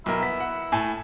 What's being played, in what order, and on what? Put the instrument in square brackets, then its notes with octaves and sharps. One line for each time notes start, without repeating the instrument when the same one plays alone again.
[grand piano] B1 A#4 [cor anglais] E4
[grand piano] B3 B6
F#5
A2 G#5 A5